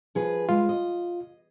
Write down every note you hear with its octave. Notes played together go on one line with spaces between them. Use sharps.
F3 G#4 B4
G#3 F4 B4
D#5